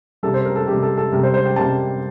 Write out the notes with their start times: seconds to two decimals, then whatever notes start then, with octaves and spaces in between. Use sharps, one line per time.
0.23 C3 G3 A#3 A4
0.34 C5
0.45 A#4
0.56 A4
0.68 C3 G3 A#3 G4
0.83 A4
0.97 A4
1.12 C3 G3 A#3 A#4
1.23 C5
1.34 C5
1.45 G5
1.56 C3 G3 A#3 A5